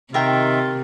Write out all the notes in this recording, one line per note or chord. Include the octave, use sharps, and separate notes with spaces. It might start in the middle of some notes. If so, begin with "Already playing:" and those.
C3 D#3 F4 A#4 E5 G5 A#5